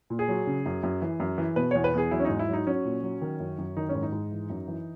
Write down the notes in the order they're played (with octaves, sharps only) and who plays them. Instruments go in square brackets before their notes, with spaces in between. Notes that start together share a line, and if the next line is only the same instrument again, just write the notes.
[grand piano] A#2
G#4
F#3
C#3
F#2
F#2
E3
F#2
E3
B2 B4
E2 C#5
B4
E2 G#4
F#3 E4
C#4
G#2 D#4
E4
F#3 D#4
F#3 C#4
A#2
F#3
D#3
F#2
F#2
D#3 D#4
C#4
G#2
D#4
G#2
E3
F#2
E3